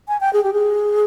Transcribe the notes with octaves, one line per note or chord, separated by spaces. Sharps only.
G#5
G5
G#4
G4
G#4